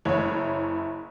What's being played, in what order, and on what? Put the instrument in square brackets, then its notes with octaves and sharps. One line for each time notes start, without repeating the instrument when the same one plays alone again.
[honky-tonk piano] F#1 E4 C#5